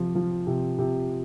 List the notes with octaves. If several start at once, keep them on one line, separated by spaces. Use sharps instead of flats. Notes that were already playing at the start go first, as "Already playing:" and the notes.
Already playing: C3 F3
F3
C3
C3